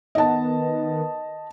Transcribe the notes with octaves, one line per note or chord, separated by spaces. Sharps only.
D#3 B3 D#5 A5